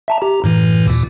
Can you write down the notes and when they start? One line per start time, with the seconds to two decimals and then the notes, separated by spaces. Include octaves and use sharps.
0.08 E5 A5 A#5
0.21 G4 A#5
0.44 F#2 A2 E3
0.87 D#2 A#2